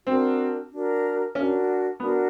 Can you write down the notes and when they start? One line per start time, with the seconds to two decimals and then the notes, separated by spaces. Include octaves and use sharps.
0.07 C4 D4 F#4 A#4
0.71 D4 F#4 A#4
1.35 C#4 D4 F#4 A#4
1.99 B3 D4 F#4 A#4